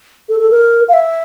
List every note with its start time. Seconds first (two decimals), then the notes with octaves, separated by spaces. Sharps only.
0.29 A4
0.40 A4
0.51 A#4
0.89 F5
0.94 E5